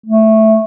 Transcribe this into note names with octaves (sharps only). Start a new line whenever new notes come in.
A3